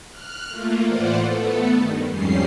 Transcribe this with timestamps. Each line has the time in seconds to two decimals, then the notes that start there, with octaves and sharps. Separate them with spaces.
0.11 F6 F#6
0.49 A3 A#3 F4
0.87 A2 E3 F4 C5 D5 F#5
1.24 A3 B3 A4
1.73 G2 D#3
2.08 F2 G#2 G3 C#4 C7